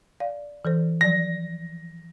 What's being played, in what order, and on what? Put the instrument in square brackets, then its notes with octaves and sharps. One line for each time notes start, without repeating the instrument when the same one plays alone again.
[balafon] D5 [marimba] F5
[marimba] E3 A4 C5
[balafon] F3 F#3 D5 [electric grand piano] A#6